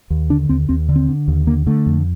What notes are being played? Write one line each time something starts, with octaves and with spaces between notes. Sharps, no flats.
D#2
D3 D4
D#2 C4
D#2 C4
D3
C4
D3
D#2
D3 A#3
D3 A3
F2